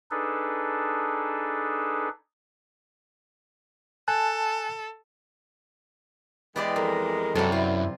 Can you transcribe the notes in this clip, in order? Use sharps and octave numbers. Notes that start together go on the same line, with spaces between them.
D4 D#4 G#4 A4 B4
A4 G#5 A5 F#6
E3 G#3 B3 G4 D5
F2 A#4
F#2 C3 G3 A4
E4 F4